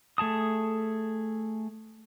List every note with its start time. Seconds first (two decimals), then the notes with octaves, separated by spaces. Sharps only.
0.18 A3 G#4 A5 D#6